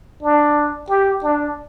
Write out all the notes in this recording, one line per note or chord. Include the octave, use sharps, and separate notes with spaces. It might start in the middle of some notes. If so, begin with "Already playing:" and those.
D4
G4
D4